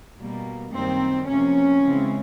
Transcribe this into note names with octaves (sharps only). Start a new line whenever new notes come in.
B2 G3 A#3
F#2 D#3 G3 A#3 C4
C3 F3 A#3 C#4
C#3 E3 G#3 C4